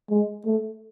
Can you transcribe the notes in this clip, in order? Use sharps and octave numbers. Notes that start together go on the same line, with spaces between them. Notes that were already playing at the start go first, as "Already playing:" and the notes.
G#3
A3